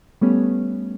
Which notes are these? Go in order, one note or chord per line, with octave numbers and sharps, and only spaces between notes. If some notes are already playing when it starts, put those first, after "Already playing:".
G3 A3 B3 C#4